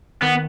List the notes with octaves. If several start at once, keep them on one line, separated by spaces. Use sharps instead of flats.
D#3 B3